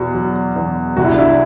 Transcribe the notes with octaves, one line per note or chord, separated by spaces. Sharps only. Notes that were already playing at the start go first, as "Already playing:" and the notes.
Already playing: E2 B2 F#4
F#3
E2
C2 F#4
E4
D4
E4